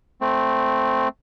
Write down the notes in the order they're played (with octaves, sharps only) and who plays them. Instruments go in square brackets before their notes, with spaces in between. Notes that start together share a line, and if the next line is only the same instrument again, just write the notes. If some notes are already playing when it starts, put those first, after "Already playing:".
[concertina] A3 C4